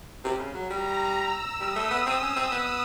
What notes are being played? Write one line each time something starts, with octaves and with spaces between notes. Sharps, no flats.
C3
C#3
F#3
G3 A#5
E6
G3 D#6
A3
B3
C4
C#4
C4
B3